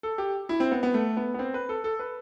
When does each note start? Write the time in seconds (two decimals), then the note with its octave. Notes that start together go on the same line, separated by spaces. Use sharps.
0.03 A4
0.18 G4
0.49 E4
0.60 C4
0.71 B3
0.83 B3
0.94 A3
1.17 B3
1.34 B3
1.39 C4
1.54 B4
1.69 A4
1.84 A4
1.99 B4